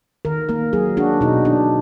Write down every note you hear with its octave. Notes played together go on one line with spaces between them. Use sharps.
D#3 A#4
A#3 A#4
F#3 G#4
D4 F#4
B2 D#4
D4